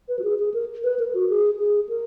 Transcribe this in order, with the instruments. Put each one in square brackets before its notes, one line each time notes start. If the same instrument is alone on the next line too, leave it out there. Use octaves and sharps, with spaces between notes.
[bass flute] B4
F#4
G#4
G#4
A#4
B4
A#4
F#4
G#4
G#4
A#4